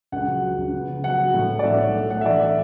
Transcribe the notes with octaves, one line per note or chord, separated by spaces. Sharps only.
C#2 F#5
F#3
F#3
C#2
B3
C#3
F#3 F#5
F#3
A2
B3
D5
A2 E5
B1 C#5
A3
A3 F#5
E5
E3 D5
E3 E5